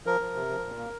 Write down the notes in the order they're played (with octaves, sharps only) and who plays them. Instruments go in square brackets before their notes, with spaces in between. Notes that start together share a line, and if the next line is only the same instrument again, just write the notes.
[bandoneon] F3 A#4
F3
C3
F3
A#2
A#3